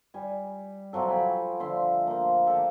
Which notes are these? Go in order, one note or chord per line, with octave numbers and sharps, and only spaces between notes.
G3 G#5
C3 F3 F#3 A4
A4 G5 G#5 B5
D3 F3 E5 C6
A#3 A#4 C5
G4 A4 G5 A5